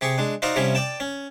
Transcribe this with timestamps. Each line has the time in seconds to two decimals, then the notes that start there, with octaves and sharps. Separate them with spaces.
0.01 C3 G4 G#4 C#6
0.18 G#3 D4
0.42 D#4 F#4 C5 D5 F5 C6
0.56 C3 F3 G3 C#4 E4
0.75 D5 G5 A5
1.00 C#4